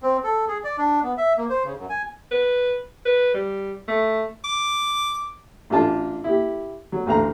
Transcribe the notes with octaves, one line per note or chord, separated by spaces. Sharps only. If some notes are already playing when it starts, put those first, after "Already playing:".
C4
A4
G#4
D5
D4
B3
E5
A#3
C5
C#3
F#2
G#5
B4
B4
G3
A3
D6
A1 D4 F4 A5
E4 G4
F#3
A1 D2 F5 A#5